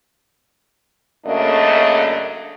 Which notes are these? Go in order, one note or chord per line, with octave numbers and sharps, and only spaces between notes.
F#2 C#3 A3 A#3 D4 D#5